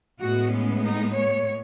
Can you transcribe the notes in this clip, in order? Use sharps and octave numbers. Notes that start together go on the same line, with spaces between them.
A2 G#3 B3 F#4
C#4
D#4
C#5